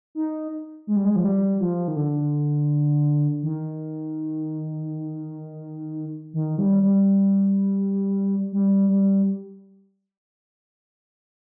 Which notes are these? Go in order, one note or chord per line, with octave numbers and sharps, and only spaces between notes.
D#4
G#3
G3
G#3
F3
G3
F3
D#3
D3
D#3
D#3
G3
G3
G3
G3